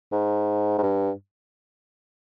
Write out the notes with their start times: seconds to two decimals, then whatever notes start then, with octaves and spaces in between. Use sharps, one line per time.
0.12 G#2
0.78 G#2
0.83 G2